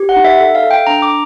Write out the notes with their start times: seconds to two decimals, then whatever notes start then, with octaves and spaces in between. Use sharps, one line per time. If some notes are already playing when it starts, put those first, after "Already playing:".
Already playing: G4
0.09 F#5
0.16 D#4
0.25 E5
0.40 A4 E5
0.55 F5
0.63 A4
0.71 G5
0.87 D4 A#5
1.02 D6